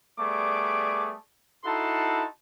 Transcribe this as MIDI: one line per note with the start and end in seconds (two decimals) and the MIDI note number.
0.19 1.14 55
0.19 1.14 57
0.19 1.14 59
0.19 1.14 68
0.19 1.14 74
0.19 1.14 86
1.64 2.24 63
1.64 2.24 64
1.64 2.24 66
1.64 2.24 69
1.64 2.24 81
1.64 2.24 84